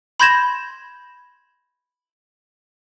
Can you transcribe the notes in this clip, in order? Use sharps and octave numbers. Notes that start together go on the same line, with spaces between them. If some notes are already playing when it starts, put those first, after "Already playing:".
B5 C6 G6 G#6 A#6 E7